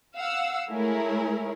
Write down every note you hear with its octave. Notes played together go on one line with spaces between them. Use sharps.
F5 F#5 E6
G#3 A3 E4 G#4 A#4 C#5